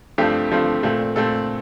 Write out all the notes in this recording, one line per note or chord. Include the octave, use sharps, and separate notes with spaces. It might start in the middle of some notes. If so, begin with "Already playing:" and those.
G2 F3 A3 C4 G4
G2 F3 A3 C4
A#2 A3 C4
A#2 A3 C4 A4